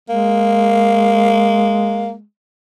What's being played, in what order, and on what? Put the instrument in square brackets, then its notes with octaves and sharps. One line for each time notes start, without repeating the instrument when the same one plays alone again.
[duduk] G#3 [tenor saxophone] A#3